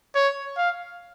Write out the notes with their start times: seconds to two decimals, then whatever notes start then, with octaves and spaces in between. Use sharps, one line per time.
0.15 C#5
0.57 F5